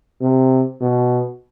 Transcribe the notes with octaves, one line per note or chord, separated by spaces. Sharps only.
C3
B2